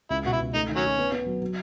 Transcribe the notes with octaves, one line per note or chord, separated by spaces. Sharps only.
C#2 E4
B2 F#4
E4
C#2
A3 D#4
D#3
F#3 C#4
D#4
B3
B3
F#3
F#3